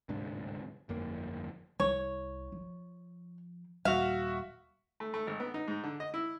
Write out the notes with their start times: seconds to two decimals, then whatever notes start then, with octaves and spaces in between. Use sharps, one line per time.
0.09 D1 G#2 C3 D4
0.89 G1 F2 A#3
1.80 C2 C#5
2.52 F3
3.85 D#1 F#4 E5 F5
5.00 A3
5.14 A3
5.27 G#1
5.40 B3
5.54 D#4
5.68 G#2
5.84 D3
6.00 D#5
6.14 E4